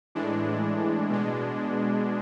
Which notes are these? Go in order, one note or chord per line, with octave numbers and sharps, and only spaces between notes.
A2 E3 G#3 D4
B2 G#3